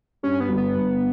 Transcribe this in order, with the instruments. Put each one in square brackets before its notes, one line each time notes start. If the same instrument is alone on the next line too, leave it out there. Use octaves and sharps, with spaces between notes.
[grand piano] G2 [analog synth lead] C#4
[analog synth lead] B3
[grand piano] G1
[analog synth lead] B3
[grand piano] G1